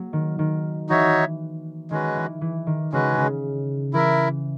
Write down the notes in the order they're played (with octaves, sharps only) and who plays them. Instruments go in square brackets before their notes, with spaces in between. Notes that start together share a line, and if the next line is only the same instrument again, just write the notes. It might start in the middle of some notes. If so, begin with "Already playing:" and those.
Already playing: [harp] F#3 A#3
D#3
D#3
[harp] E3 [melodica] D#4 F#4 C#5 E5
[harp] D#3 [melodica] G#3 C#4 F#4 B4
[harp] E3
E3
D#3
[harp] C#3 [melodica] G#3 C#4 F#4 B4
[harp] C#3
[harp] E3 [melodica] E4 A#4 E5